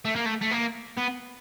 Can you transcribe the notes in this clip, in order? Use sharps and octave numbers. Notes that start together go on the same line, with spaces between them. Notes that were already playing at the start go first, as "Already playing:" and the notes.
A3
A#3
A3
A3
A#3
B3